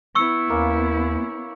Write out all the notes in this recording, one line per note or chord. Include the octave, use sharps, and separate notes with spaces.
B3 E4 C#6 E6 C#7
D#2 A#3 C#4